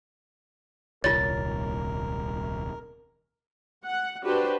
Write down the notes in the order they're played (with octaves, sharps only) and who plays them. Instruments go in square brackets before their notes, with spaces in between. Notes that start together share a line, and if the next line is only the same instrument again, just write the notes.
[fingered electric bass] D#1 C2 [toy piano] F4 C#5 [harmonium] A#4 [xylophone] A6
[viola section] F#5
D4 F#4 G4 B4 C5